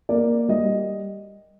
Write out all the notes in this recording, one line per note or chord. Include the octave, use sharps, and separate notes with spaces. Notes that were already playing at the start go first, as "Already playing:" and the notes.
A#3 D5
G3 D#5